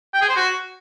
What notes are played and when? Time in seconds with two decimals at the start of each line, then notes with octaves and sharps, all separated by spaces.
0.14 G5
0.21 G#4
0.29 C5
0.36 F#4